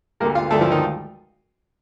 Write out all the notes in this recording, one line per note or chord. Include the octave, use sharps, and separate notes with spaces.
D2 D3 G3 A#3 A#4
F4 F5
D2 D3 G3 A3 A4
F3 F4
D#3 D#4